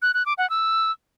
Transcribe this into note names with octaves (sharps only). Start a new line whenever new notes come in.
F#6
F#6
D6
F#5
E6